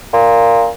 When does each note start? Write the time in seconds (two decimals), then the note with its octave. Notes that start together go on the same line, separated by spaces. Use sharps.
0.13 A#2